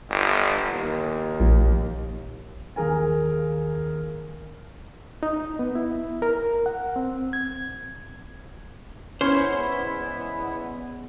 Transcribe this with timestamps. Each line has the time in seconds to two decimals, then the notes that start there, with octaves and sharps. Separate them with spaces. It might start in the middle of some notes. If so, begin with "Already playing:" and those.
0.10 G1
0.72 D#2
1.40 A#1
2.76 D#2 G#4 A#4 G#5
5.23 D#4
5.59 B3
5.75 E4
6.22 A#4
6.66 F#5
6.96 C4
7.33 G#6
9.21 E2 G#3 B3 C#4 E4 C5 C#5